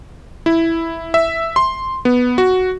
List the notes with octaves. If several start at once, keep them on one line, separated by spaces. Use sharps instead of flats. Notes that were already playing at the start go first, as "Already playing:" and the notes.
E4
E5
C6
B3
F#4